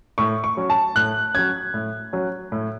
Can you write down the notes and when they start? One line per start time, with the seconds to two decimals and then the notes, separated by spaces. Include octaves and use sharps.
0.18 A2 C#6
0.44 C#6
0.57 F#3 C#4
0.70 A5
0.95 A2 F#6
1.35 F#3 C#4 G#6
1.74 A2
2.13 F#3 C#4
2.52 A2